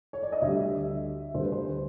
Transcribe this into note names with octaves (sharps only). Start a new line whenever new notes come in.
C#5
D5
D#5
D2 D3 G3 E5
D2 D3 G3 C5
B4
C5